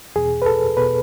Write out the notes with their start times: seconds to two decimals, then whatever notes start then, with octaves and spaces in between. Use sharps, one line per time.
0.16 E2 B2 G#4
0.42 B4
0.46 A4
0.77 B2 B4